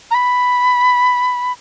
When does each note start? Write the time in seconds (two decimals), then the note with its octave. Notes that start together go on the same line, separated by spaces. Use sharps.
0.11 A#5
0.14 B5